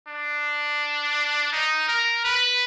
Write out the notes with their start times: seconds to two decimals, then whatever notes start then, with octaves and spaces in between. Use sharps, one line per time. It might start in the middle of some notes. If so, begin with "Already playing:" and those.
0.09 D4
1.53 D#4
1.88 A#4
2.24 B4